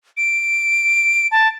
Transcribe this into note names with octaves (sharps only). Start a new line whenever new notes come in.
D7
A5